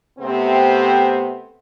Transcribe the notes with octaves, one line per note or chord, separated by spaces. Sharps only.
C3 A3 B3 C4